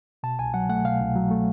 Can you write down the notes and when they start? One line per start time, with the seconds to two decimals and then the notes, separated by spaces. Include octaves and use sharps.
0.23 B2 A5
0.39 C2 G#5
0.54 F#3 F#5
0.69 A3 F#5
0.85 B2 F5
1.00 C2
1.15 F#3
1.31 A3